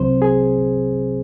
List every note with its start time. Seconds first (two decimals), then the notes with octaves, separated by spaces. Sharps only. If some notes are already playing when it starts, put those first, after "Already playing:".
Already playing: C2 C3 F#3 C4 C5
0.22 G#4